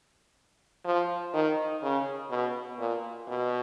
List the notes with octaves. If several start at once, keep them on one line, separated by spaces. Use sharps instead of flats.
F3
D#3
C#3
B2
A#2
B2